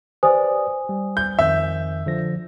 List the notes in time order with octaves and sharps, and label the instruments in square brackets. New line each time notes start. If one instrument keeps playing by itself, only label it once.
[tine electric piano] G4 B4 D5 [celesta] C5 G#5 D#6
[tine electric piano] G3
[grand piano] G6
[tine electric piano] F2 D#3 G6 [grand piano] E5
[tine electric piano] D3 F3 A#6